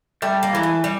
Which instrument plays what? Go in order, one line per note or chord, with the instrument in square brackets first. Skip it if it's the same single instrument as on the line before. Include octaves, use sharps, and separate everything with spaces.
[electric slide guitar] G3 [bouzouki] A3
[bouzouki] A#3
[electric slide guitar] E3 [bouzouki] G#3
[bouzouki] A3
G3